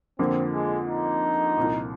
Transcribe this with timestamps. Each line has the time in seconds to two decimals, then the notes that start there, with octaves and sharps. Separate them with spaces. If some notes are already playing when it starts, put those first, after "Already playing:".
0.19 F2 D3 F3 A#3 C4
0.53 G#3
0.88 D#4
1.57 C2 A#2 F3